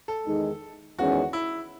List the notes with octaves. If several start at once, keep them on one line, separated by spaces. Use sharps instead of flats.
A4
E2 D#3 G#3 D#4
E2 D#3 G#3 C#4 F#4
E4